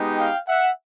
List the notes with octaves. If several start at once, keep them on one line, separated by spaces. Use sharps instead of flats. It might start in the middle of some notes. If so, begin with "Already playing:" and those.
Already playing: G#3 B3 D#4 G4
F5 G5
E5 F#5